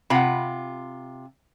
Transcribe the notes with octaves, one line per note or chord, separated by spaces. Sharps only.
C3 F4 F#5 B5